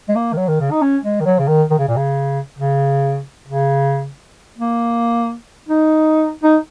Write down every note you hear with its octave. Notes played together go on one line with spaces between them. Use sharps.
G#3
A#3
D#3
F#3
D#3
C#3
D#4
C#4
G#3
D#3
F#3
C#3
D#3
D#3
C#3
A#2
C#3
C#3
C#3
A#3
D#4
D#4